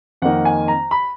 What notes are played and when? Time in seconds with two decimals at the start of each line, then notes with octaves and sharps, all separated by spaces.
0.22 F2 D#3 A#3 D#4 F#5
0.45 G#5
0.68 A#5
0.91 B5